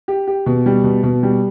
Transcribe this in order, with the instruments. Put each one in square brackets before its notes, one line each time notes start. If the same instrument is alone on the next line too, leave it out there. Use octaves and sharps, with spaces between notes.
[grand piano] G4
G4
B2
G3
B2
B2
G3